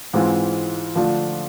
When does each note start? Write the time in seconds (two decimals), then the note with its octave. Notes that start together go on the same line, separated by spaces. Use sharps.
0.13 G#2 E3 G#3 C4 F4
0.95 D3 F3 A3 D4 F4